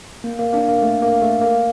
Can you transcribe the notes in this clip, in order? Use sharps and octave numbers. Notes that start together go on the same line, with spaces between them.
A#3
A#3
A#3 D4
A#3
A3
A#3
A3
A#3